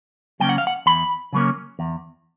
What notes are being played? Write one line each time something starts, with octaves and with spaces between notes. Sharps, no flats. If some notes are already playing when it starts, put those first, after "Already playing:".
C#3 F#3 A#3 C#4 G5
F#5
F5
F#5
E2 B5
C#3 F#3 A#3 C#4
E2